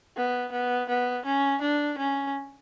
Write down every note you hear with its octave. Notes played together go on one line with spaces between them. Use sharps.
B3
B3
B3
C#4
D4
C#4